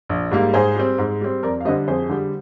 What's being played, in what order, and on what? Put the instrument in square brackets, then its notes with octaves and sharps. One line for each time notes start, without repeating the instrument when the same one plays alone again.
[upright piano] A#1
G#2 G3 A#3
G#2 G#4 C5
G3 C4
G#2
G3 C4
F2 A#4 D5
F5
G3 C5 D#5
D3
F2 G#4 C5
D3 G3